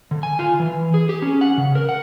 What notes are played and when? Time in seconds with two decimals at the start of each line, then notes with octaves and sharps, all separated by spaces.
0.11 D3
0.23 G#5
0.39 F4
0.60 E3
0.94 G#4
1.09 G4
1.22 C#4
1.41 F#5
1.58 C#3
1.75 A#4
1.89 F#5